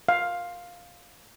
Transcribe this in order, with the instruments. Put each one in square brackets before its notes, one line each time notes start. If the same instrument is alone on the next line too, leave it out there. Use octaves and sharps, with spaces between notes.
[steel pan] F5